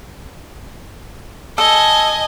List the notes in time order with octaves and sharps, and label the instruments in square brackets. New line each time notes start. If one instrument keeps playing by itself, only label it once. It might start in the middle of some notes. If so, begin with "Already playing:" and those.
[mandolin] A4 [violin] D#5 G#5